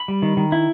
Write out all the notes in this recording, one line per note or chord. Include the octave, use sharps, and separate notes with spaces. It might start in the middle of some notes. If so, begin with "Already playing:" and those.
Already playing: B5
G3
D#3
D#3
E4